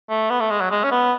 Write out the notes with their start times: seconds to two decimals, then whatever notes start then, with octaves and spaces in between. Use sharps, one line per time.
0.09 A3
0.30 B3
0.40 A3
0.50 G#3
0.61 F#3
0.71 G#3
0.84 C#4
0.92 B3